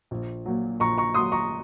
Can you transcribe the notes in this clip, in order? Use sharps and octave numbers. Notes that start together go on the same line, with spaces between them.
A#1
A#2 F#3
A#1 A#5 C#6
A#5 C#6
A#2 F#3 C6 D#6
A#5 C#6